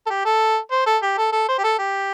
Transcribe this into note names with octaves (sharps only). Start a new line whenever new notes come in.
A4
G4
A4
C5
A4
G4
A4
A4
C5
G4
A4
G4